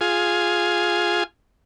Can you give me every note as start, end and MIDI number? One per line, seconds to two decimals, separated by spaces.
0.01 1.24 65
0.01 1.24 68